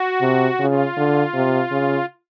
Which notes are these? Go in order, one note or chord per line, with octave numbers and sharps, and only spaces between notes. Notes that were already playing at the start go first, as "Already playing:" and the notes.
Already playing: F#4
C3
C#3 F4
D3
C3
C#3